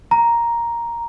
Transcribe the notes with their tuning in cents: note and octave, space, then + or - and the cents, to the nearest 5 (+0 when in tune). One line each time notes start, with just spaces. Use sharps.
A#5 +5